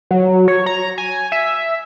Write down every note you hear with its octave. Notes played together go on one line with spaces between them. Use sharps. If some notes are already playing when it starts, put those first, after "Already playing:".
F#3
C#5
A#5
G#5
E5